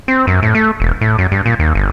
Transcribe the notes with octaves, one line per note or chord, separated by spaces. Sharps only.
C4
F#2
A2
A3
E1
A2
F#2
G2
A#2
D#2
G1